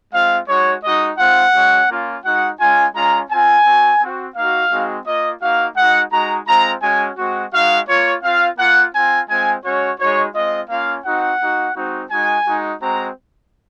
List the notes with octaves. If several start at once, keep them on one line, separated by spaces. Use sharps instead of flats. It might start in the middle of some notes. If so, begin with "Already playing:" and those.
G#3 C4 F4 F5
G#3 D#4 F#4 C#5
G#3 D#4 F#4 D#5
G#3 C4 F4 F#5
G#3 C#4 F#4
A#3 C#4 F4
G#3 D#4 F#4 F#5
G#3 C#4 F4 G#5
G#3 C#4 F4 A#5
C4 F4 G#5
C4 F#4
C4 F#4
A#3 D#4 F#4 F5
G#3 C4 D#4 F#4
A#3 F4 D#5
A#3 D#4 F#4 F5
G#3 D#4 F#4 F#5
G#3 D#4 F#4 A#5
G#3 C4 F4 A#5
G#3 C#4 F#4 G#5
G#3 C4 F#4
G#3 D#4 F#4 F5
A#3 F4 C#5
C4 F4 F5
A#3 F4 F#5
C4 F4 G#5
G#3 C4 F4 G#5
G#3 C#4 F#4 C#5
G#3 D#4 F#4 C#5
G#3 C4 F4 D#5
A#3 C#4 F4 F5
C4 D#4 F#4 F#5
A#3 D#4 F#4
G#3 C4 D#4 F#4
G#3 D#4 F#4 G#5
G#3 D#4 F#4
G#3 C4 F#4 A#5